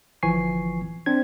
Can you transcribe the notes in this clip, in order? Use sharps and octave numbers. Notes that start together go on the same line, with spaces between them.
G1 E3 F3 G#5 C#6 C7
C4 D4 C5 G#6